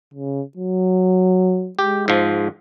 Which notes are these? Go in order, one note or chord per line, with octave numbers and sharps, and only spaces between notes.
C#3
F#3
G#3 G4
G#2 F3